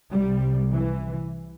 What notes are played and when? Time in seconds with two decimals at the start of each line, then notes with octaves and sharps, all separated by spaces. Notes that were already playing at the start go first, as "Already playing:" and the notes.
0.13 C2 C3 G3
0.71 E3